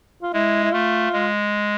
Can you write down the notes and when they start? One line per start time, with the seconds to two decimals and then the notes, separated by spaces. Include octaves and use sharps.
0.23 F4
0.33 G#3 E4
0.64 E4
0.73 A3 F4
1.13 G#3